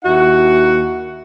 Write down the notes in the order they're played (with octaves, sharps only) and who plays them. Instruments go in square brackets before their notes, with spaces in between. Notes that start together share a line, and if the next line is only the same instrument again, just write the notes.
[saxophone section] D#2 E4 F#4 F#5